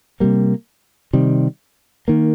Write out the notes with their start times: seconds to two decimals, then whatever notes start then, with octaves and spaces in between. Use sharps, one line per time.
0.20 C3 G3 A#3
1.13 C3 D#3 G3
2.08 D#3 A#3